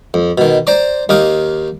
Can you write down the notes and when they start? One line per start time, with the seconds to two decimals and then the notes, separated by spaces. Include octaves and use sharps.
0.14 F2
0.38 B2 D#3
0.67 C5 D5 A#5 C6 D6
1.09 D#2 D#4 F5 D6